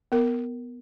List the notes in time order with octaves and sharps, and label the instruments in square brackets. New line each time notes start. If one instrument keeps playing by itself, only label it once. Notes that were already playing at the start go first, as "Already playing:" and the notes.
[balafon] B3 A#4